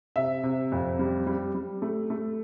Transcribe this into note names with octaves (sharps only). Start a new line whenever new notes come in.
C3 E5
C3
F2
G3
G3
G3
A3
A3